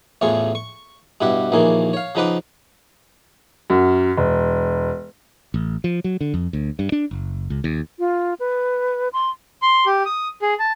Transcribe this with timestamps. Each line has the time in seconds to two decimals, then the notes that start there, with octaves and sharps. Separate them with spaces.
0.21 A1 E2 A2 F4 G#4 C#6
0.55 C#6
1.21 G2 B2 E4 G4 F#5
1.52 A#1 D#2 E3 A#3 G#4
1.93 C#5 F5
2.15 C#3 F3 D#4 B4 F#5 D6
3.70 F#2
4.17 E1
5.54 A1
5.84 F3
6.04 F#3
6.21 D3
6.34 F2
6.53 D2
6.79 G2
6.92 D4
7.11 F#1
7.50 C#2
7.64 D#2
7.99 F4
8.40 B4
9.13 C6
9.62 C6
9.86 G4
10.05 D#6
10.42 G#4
10.59 A5